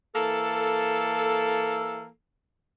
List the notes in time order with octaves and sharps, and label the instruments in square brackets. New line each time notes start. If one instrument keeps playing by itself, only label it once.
[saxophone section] E3 A#3 A4